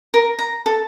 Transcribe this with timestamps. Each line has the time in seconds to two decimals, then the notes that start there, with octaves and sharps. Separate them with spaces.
0.14 A#4
0.39 A#5
0.66 A4